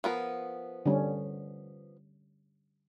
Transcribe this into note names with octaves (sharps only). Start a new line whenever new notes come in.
F3 B3 A#4
D3 G3 C#4